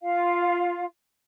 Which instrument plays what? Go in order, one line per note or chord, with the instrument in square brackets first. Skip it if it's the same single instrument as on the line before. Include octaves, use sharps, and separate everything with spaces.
[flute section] F4 F5